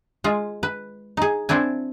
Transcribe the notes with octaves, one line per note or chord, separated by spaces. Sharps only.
G#3 F4 G#4
B4
D#4 G#4
C4 D4 E4 G#5